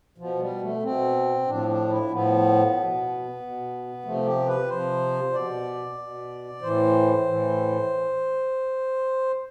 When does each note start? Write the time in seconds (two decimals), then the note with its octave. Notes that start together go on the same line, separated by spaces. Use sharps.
0.18 B2 F3
0.39 G3
0.61 A3
0.83 B2 C4
1.47 A2 F3 D4
1.68 D4
1.90 E4
2.11 A2 F3 B3
2.76 B2
3.40 B2
4.04 C3 F3 A3
4.26 G4
4.47 B4
4.68 C3 F3 C5
5.32 B2 D5
5.97 B2
6.62 A2 E3 C5
7.26 A2 E3